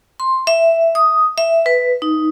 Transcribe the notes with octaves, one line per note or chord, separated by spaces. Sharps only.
C6
E5
D#6
E5
B4
D#4